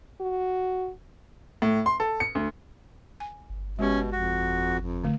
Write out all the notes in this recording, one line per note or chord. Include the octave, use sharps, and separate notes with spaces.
F#4
A2
C6
A4
C#7
D2
G#5
G1
B2 G#3 C#4 G4
F2 F#4
F2
D3 A3